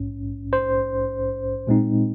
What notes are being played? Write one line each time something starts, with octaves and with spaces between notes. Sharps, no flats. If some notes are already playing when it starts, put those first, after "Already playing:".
Already playing: A#1 G#2 C#4
C5
A#2 G#3 C4 D#4